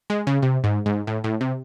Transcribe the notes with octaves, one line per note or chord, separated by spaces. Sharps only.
G#3
C#3
C3
G#2
G#2
A2
A2
C3